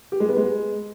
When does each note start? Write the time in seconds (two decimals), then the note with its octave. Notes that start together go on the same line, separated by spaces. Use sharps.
0.12 G4
0.20 G#3
0.29 B3
0.37 G#3